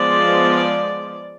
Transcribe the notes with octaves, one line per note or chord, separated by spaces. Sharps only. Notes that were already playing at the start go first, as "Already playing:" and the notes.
Already playing: F3 G#3 B3 D5